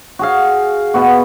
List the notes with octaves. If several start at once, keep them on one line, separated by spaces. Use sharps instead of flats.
F#4 G#4 F5
B2 B3 F#4